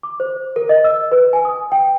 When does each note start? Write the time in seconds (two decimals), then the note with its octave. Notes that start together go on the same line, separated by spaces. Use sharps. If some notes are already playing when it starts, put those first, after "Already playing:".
0.03 D6
0.20 C5
0.56 A#4
0.69 D#5
0.84 E6
1.12 B4
1.33 G#5
1.45 D#6
1.72 G5